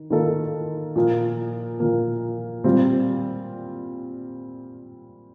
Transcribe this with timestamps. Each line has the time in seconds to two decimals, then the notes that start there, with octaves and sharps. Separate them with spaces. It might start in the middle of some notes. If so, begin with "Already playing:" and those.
Already playing: D#3
0.10 D#3 A#3 F4 A4
0.96 A#2 F3 A#3
1.80 A#2 F3 A#3
2.64 A#2 G3 C4 F4